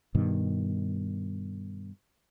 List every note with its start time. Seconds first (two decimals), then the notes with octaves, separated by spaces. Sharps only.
0.15 G2 B2 D#3